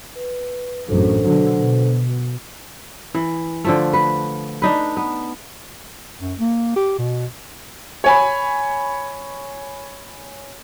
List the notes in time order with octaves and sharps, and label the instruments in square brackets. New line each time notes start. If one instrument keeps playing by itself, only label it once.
[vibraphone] B4
[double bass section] A1 F#2 A2 [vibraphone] D4 A4 C5
[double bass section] B2 D3 F#3
B2
[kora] E3
D3 F3 A3
B4
D4 D#4 B4
B3
[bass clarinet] F#2
A#3
G4
B2
[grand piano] C#5 G#5 B5